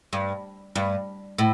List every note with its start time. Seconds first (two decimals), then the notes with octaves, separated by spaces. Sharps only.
0.13 G2
0.75 G2
1.38 A2